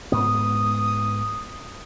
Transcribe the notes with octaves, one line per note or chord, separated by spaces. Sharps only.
G#2 B3 D#6